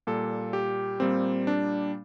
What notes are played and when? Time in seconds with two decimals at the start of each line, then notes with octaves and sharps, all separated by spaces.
0.07 A#2 G3 A#3 A4
0.53 G4
1.00 A#2 G3 A#3 C4
1.47 D4